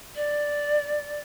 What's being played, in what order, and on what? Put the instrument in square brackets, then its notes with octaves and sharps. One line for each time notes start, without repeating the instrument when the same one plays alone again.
[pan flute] D5